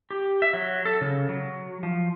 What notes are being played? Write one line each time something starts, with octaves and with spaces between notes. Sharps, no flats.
G4
E5
F#3
A4
C#3
F#3
F3